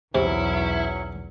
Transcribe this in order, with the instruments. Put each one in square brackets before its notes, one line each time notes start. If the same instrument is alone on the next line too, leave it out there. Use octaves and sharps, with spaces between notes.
[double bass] B1 E2 [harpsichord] C3 [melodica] F#3 C#4 C#6 [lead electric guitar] E4